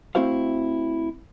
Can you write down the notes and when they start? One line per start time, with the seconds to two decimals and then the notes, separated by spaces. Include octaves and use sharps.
0.15 A3 C4 E4 F#4 C5 F5